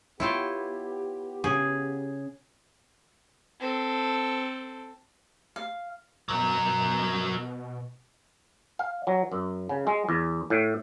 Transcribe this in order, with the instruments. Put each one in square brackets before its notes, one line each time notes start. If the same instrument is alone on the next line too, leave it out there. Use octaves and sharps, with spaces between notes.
[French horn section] B3 G4 [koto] E4 F4 G5 [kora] C#5
[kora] C#3 [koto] G#4
[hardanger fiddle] C4 A4
[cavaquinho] F5
[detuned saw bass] B2 [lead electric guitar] F#3 A#4
[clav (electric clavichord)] F5
F#3
F#2
C#3
G#3
E2
A2